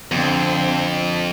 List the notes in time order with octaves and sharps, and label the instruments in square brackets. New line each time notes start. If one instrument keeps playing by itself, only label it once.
[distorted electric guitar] F2 [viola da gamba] D3 C4